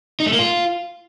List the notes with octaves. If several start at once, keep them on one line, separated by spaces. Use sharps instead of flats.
D#4
A3
A#3
F4